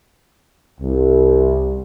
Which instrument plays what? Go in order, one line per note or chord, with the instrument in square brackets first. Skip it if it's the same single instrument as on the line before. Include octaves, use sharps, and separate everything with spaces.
[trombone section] C2